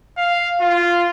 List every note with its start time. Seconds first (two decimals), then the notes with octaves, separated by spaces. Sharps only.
0.18 F5
0.61 F4